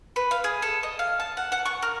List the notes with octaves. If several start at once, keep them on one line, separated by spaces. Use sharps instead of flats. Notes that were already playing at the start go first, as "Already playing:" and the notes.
B4
F5
G#4
A4
D#5
F5
A5
F#5
F#5
C#6
A#4